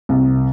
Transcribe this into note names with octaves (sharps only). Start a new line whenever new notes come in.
C2